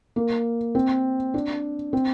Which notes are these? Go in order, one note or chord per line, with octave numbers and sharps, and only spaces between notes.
A#3
C4
D4
C4